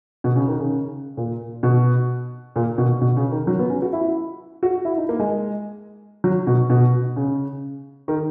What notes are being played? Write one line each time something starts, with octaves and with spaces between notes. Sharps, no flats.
B2
C#3
D#3
C#3
A#2
B2
A#2
B2
B2
C#3
D#3
F#3
B3
C#4
F#4
E4
F#4
E4
D#4
A#3
G#3
F#3
B2
B2
C#3
D#3